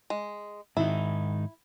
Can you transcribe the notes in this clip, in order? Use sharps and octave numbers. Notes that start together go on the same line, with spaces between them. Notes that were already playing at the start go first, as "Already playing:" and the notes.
G#3
G#2 D#3 D#4 E4